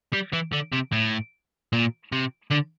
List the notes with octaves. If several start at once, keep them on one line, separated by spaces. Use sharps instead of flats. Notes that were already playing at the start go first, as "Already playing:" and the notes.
G3
E3
D3
C3
A2
A#2
C3
D3